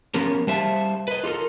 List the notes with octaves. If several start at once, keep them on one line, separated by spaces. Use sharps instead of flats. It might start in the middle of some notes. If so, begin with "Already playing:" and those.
F3 B3 C#4 A#4
G3 C5 E5 F5 A5
B4 D#5
F4 G4 A4 A#4